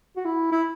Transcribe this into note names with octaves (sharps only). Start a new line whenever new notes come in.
F#4
E4
E4